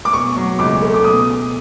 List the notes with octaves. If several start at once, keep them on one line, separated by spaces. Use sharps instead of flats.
D6
B2 C#6
F#3
C#2 D6
A3
D6
B2 D#6